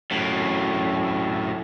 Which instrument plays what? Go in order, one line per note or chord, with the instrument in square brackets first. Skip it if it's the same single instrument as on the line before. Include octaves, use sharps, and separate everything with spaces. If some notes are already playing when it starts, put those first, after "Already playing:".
[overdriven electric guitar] F#2 A2